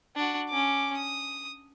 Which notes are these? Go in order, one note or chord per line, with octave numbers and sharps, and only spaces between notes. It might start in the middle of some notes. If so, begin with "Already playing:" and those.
D4 F#4
C#4 D6
D#6